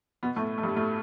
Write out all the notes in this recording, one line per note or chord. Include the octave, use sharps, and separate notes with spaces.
B2 B3
A2 A3
A3
G2 G3
A2 A3